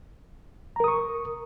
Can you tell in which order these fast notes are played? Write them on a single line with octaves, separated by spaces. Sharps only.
A#5 A#4 D#6 C#6